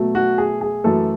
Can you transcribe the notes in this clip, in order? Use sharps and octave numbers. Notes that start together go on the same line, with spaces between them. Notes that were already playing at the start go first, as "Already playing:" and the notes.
Already playing: B2 F#3 A3
F#4
G#4
G#4
F#2 E3 A3 A4